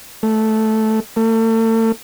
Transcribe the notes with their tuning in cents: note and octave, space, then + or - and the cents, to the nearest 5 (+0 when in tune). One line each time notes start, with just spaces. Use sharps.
A3 -5
A3 +40